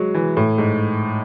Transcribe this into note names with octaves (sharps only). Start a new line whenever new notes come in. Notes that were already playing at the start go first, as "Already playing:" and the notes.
Already playing: F#3 G#3
E3
A2
G#2